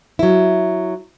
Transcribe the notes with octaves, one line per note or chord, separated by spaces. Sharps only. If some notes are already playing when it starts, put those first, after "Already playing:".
F#3 E4